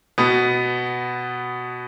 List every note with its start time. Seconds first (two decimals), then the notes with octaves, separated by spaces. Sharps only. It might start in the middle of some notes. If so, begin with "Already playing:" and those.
0.18 B2 B3